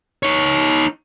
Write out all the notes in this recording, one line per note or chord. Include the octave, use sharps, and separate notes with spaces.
D#4 C#5